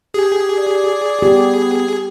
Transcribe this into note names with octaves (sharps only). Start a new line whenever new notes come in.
G4 G#4
D5
B3 G4